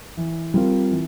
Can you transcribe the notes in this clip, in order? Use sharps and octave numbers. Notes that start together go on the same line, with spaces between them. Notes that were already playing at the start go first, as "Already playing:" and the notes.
E3
G3 C4 F4 A#4
E3